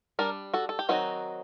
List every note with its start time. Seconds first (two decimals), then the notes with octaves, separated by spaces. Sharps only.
0.19 G3 D4 A#4 D5
0.54 F#4 A4
0.69 A4
0.79 G4
0.89 D#3 F#3 C4 D#4 F#4